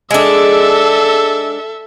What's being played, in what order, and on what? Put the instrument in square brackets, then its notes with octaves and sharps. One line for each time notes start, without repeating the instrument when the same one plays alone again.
[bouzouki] G#3 D4 [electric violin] A4 E5